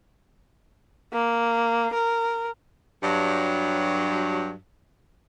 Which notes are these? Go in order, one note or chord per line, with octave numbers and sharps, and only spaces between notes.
A#3
A#4
G2 F#3